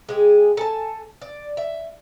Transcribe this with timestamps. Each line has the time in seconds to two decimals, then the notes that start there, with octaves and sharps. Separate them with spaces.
0.09 G#3 G4 G#4
0.57 A4 G#5 A5
1.22 D5
1.57 E5